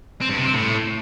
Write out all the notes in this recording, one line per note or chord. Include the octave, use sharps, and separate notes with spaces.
C4
G2
C3
C4
A2